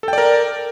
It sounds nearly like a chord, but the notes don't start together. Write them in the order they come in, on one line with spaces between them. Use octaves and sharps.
A4 G5 D5 A#4